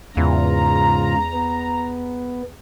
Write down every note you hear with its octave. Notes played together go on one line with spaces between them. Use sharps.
E2 G#2 C#3 F4 A#5
B3